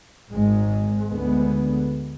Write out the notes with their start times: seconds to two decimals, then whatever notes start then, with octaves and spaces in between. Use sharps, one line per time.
0.32 G#1 G#2 G#3
1.11 D2 D3 G#3 B3